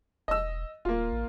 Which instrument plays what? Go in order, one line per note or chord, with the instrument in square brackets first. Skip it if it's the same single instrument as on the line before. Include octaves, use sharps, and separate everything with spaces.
[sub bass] E1 [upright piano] D#5 E6
[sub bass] D#1 [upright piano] A#3 F4
[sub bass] A1